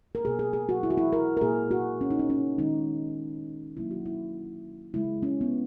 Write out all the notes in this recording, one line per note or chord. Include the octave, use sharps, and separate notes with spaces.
A#4
B2 A#3 G#4
G#4
G#4
F#4
E4
F#4
E4
A#4
A#4
A#2 A#3 G#4
F#4
C#4
D#4
C#4
C#4
D#3 G#3 D#4
B2 F#3 A#3 E4
F#4
E4
C#3 G#3 E4
C#4
B3